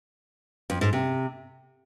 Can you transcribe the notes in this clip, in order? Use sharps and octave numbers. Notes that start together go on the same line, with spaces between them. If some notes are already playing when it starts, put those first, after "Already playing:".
F2
G#2
C3